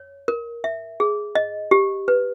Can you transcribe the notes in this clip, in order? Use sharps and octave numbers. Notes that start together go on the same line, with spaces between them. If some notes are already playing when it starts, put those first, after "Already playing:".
Already playing: C#5
A#4
E5
G#4
D#5
G4
B4